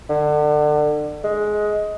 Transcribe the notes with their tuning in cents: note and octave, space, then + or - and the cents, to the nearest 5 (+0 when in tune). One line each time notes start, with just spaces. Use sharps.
D3 +30
G#3 +15